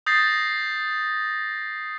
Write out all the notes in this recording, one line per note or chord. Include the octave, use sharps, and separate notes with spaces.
D#6 G6 A6 A#6 C7